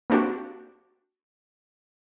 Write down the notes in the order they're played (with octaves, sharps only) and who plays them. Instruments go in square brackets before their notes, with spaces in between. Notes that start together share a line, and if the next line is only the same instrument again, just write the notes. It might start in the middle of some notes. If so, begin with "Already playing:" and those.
[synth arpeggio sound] A#3 C4 D4 F#4 G4